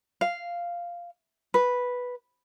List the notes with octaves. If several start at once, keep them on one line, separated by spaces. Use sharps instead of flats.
F5
B4